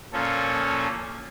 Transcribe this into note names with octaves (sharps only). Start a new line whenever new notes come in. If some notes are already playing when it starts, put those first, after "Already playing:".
A#2 F3 A#3 C#4 A4